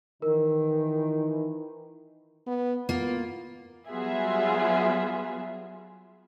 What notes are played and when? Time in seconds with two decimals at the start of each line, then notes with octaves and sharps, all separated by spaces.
0.22 D#3 E3 D#4 A#4
2.47 B3
2.89 A#3 B3 F4
3.88 F#3 G3 B3 F4 G#4 E5